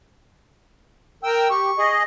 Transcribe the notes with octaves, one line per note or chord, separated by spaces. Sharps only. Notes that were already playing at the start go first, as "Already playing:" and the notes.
A#4 G5 E6
G4 C#6
G#4 D#5